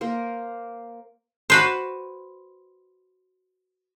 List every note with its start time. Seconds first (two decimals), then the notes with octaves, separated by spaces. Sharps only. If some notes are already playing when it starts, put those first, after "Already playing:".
0.01 A#3 A#4 C5
1.50 F#4 B4 C5